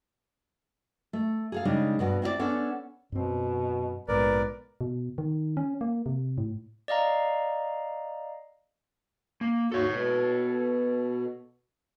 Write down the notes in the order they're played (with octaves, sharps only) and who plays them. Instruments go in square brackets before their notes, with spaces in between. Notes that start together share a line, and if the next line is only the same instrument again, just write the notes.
[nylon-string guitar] A3
G#4 A4 F5
C#3 G3 G#3 D4 D#4
G2 B2 B3
C4 E4 G#4 D5
B3 C#4 D4 A4
[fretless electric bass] F#2 C4 [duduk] B2
[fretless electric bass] A#1 G#2 B2 [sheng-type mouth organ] A#4 D5 [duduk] B4
[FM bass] B2
D#3
C#4
A#3
C3
A2
[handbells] D5 D#5 F5 A#5
[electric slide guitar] A#3
[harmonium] D#2 G#2 F#4 [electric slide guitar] A4 C#5
[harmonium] B2